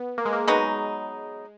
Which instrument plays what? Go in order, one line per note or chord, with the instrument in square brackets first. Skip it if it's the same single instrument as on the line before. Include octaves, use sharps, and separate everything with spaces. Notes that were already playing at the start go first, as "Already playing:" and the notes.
Already playing: [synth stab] B3
A#3
G#3
A#3
[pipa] F#3 B3 D#4 [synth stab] G#3